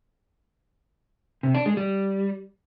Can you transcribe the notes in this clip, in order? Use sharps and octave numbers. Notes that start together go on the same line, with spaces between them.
C3
D4
G#3
G3